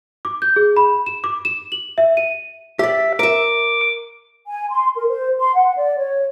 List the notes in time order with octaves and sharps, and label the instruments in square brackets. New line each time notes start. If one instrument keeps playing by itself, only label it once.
[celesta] D6
G6
G#4
B5
E7
D6
E7
F#7
E5
D#7
[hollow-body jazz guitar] G4 D5 [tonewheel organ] E5
[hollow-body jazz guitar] A#4 E5 [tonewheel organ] D6
[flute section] G#5
C6
A#4
C5
C6
F#5
D5
C#5